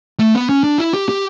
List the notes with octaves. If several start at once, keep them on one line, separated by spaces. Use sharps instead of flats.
A3
B3
C#4
D4
E4
G4
G4